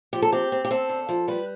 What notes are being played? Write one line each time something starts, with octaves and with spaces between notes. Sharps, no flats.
F3 G4
A4
C4 G4
C4
G4
C4 A4
D3
F3
G3 B4